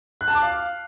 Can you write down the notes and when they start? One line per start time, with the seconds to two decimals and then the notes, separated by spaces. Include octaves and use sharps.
0.21 F#6
0.28 A5
0.35 D6
0.42 F5